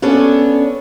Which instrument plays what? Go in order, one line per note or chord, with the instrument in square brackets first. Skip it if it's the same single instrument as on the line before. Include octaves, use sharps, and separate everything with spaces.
[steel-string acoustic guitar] B3 C#4 D4 A4 C#5